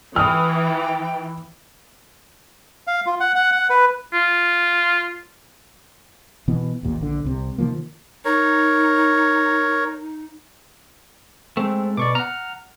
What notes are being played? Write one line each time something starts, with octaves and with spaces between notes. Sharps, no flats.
E3 G5 D#6 F6
F5
F4
F#5
F#5
F#5
B4
F4
B2 E3 B3
A#1 D#2 A#2
A#1 D3
C2 C3
C3 D#3 F3 A#3
D#4 A#4 C#5
G#3 A3 C4
B2 D5 C#6 D6
F#5 A#5 F6